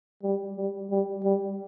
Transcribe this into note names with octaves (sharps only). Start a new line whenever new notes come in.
G3
G3
G3
G3